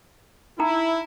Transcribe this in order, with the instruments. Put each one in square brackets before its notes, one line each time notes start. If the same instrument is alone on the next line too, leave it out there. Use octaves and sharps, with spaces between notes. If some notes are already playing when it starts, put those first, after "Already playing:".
[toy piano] D#4 G5 A#5 [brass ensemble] E4